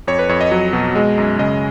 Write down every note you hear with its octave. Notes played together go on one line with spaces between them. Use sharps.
F2 C#5
B4
F2 C#5
D#5
F#3
B2
G#3
F#2
C#3 D#5